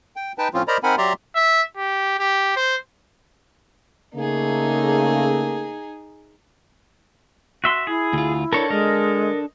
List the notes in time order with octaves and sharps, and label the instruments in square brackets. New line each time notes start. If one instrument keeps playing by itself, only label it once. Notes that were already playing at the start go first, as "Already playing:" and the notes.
[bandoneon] G5
D#4 B4 G5 A5
A2 F3 C4 C#4 F4
A#4 C5 D5 D#5 A#5 B5
C4 D#4 A#4 F#5 G#5 B5
F#3 G4 D5 E5 A#5 C6
[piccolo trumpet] E5
G4
G4
C5
[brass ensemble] C#3 A3 A#3 [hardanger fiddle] D#4 G#4
[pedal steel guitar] F#4 E5 C6
[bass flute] E4 [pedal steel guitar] G#4
[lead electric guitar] D2 F4
[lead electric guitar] D4 A4 [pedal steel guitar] A#4 C#5
[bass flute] G#3 [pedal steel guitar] A#4 D#5